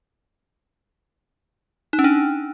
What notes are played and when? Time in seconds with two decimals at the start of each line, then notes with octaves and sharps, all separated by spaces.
1.93 D#4
1.99 C#4
2.04 D4